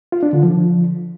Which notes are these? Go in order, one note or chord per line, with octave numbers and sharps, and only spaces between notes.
F4
D4
D3
F3